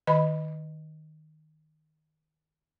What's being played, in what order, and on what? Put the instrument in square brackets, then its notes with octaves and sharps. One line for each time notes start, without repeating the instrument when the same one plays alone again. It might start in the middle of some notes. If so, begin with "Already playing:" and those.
[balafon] D#3 D#5 B5